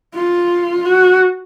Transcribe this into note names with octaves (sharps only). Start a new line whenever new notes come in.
F4
F#4